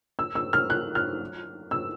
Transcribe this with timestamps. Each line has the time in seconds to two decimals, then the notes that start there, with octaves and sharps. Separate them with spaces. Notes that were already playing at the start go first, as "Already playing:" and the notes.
0.19 E6
0.35 E6
0.53 F6
0.70 F#6
0.95 F6
1.71 E6